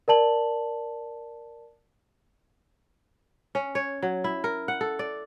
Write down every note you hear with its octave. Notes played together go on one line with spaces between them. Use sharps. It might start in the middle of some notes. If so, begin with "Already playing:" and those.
A#4 D5 A5 F#7
C#4
C#5
F#3
E4
A#4
F#5
A4
D5